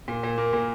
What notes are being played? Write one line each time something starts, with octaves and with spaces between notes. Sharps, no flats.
A#2
A#2
A#3
A#2